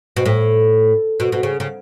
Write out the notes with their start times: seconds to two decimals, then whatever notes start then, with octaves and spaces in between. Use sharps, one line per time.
0.16 B2
0.26 A2
1.20 B2
1.32 B2
1.43 C#3
1.60 C#3